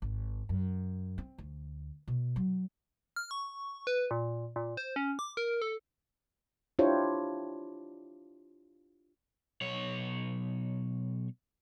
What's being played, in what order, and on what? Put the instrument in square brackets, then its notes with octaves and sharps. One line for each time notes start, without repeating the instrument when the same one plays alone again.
[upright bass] G#1
F#2
C4
D2
B2
F#3
[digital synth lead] F6
C#6
B4
A#2
A#2
C5
C#4
D6
A#4
A4
[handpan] D4 E4 F4 G4 C5 C#5
[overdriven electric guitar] B1 C#5